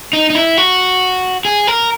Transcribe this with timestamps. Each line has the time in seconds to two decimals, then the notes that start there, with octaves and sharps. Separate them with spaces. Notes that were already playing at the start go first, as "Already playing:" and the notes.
0.13 D#4
0.30 D#4
0.35 E4
0.57 F#4
1.45 G#4
1.67 A#4